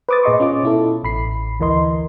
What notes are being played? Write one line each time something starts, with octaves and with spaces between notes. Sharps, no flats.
B4 C5 D6 D#6 A6
A#2 G#4 D#5 C6 C#6
C#4 F4 D6
B2 E4 A4
A1 B5 C7
D2 E3 A#4 D#5 C6